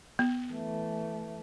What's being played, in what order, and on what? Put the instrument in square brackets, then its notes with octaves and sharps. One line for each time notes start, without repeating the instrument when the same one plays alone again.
[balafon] B3
[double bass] E3 A3